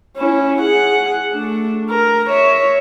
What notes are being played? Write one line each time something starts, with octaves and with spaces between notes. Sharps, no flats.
C#4 E4
G#4 F#5
A3 D4
A#4
C#5 E5